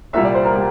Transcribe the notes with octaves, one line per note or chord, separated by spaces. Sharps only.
C2 A#2 G3 E5
D5
C5
A#4
G3 G4